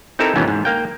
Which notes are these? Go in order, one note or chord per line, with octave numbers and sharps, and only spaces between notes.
C4 D#4 E4 G4 A4 A#4
D#2 G#2 B2 E3 B3 C#4
G#2
A#3 F5 G5